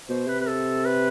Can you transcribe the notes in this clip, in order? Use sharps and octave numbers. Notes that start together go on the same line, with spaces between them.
B2 C5
C3 B4
B4
A4
B4